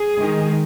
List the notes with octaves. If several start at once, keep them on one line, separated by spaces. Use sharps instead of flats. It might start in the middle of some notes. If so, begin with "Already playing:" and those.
Already playing: G#4
D#3 G#3